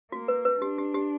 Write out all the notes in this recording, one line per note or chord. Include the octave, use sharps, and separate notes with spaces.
A#3 F#4
B4
B4
D4 G4
G4
G4